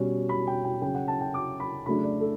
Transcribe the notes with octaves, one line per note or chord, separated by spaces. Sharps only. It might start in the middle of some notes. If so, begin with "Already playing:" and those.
Already playing: B2 G3 C#4
B5
G5
G5
C#3 F#3 C#4 G5
F#5
A5
G5
D6
B5
C#3 F#3 A3 D4 B5
D5
A4